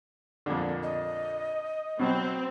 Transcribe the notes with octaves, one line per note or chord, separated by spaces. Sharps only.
F2 A#2 D3
D#5
B2 F#3 C4